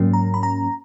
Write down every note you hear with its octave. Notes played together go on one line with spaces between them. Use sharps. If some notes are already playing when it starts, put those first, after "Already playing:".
Already playing: G#2 F#3 A#3 C#4
A#5
B5
A#5